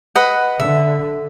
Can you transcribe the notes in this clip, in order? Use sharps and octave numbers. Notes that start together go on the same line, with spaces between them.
B4 D#5 F#5
D3 E5